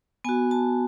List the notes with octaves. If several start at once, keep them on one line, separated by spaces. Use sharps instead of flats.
B3 F#4 G#5
A5